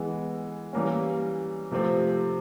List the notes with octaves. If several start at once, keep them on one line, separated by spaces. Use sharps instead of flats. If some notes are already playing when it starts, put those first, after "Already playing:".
Already playing: E3 G#3 B3
E3 G3 A#3 C#4
C3 F3 A3 C4